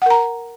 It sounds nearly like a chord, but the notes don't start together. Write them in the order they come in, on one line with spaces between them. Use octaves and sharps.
F#5 A#4 A#5